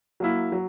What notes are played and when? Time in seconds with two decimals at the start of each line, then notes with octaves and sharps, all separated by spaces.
0.20 F#3 A#3 E4
0.52 F#3